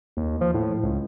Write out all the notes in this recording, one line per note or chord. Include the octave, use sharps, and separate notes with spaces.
D#2
F3
A2
C#2